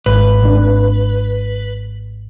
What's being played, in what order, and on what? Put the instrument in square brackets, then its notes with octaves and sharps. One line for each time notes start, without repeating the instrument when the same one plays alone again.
[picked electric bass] G#1 [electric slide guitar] B4
[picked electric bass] G#1 D4